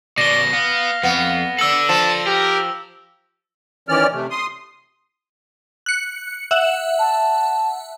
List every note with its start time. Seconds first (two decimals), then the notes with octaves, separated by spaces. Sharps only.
0.18 B2 C#4 D5 A#6 G7
0.53 B3 F5
1.03 F2 B3
1.59 A4 D5 E6 F#7
1.89 F3 A5
2.27 G4 A#4
3.89 D#3 E3 C#4 D5 F6
4.13 C3 A3
4.30 C6 D#6
5.86 F#6 C#7
6.51 E5 F#5
6.99 A5